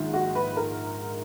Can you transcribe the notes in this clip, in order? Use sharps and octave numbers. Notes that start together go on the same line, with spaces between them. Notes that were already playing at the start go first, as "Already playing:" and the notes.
Already playing: A#1 G#2 D#3
F#4
B4
A#4